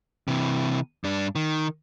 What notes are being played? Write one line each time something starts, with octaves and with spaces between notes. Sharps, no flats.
C3 E3
G2 D4
D#3